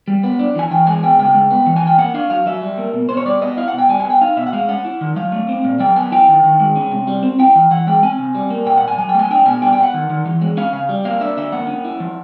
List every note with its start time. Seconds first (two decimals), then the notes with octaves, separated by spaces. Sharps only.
0.08 G3
0.23 B3
0.39 D4
0.55 E3 G#5
0.71 E3 G5
0.87 G#3 G#5
1.03 B3 G5
1.19 C#3 G5
1.35 G#3
1.50 B3
1.66 E3
1.76 G#5
1.83 E3 G5
1.98 A#3 F#5
2.14 D4 F5
2.30 F#3 F5
2.46 F#3 E5
2.62 G3
2.78 A#3
2.94 B2
3.09 B2 C5
3.17 C#5
3.25 G3 D5
3.41 B3 D#5
3.57 E4 F5
3.68 F#5
3.73 B2
3.79 G5
3.89 G3 G#5
4.00 G#5
4.05 B3
4.10 G5
4.21 D#4 F5
4.37 B2 E5
4.47 F#5
4.53 G#3 F5
4.69 C#4 F#5
4.85 E4
5.01 D#3
5.16 F#3 F5
5.32 A3
5.49 C4
5.64 A#2
5.80 F#3 G5
5.96 B3 G#5
6.12 E4 G5
6.28 D#3
6.44 D#3
6.60 G#3
6.76 C#4
6.92 C3
7.07 G3
7.23 C4
7.39 E4 G5
7.55 E3
7.71 E3 F#5
7.87 G#3 G5
8.03 C4 G#5
8.19 C3
8.35 G3
8.51 A#3
8.66 A#2 G5
8.77 F#5
8.82 A#2
8.88 G#5
8.98 F#3 G#5
9.09 G5
9.14 A3 G#5
9.30 D4 G5
9.46 B2 G#5
9.62 G3 G5
9.73 G5
9.77 B3
9.83 F#5
9.94 D#3
10.10 D#3
10.26 E3
10.41 G#3
10.57 C#4 F5
10.73 C#3 F5
10.89 G3
11.05 A#3 F5
11.21 D4 E5
11.37 D3 E5
11.52 A#3 F#5
11.68 C#4
11.84 E4
12.00 F3